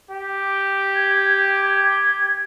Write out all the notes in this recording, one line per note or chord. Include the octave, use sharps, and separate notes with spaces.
G4
G#6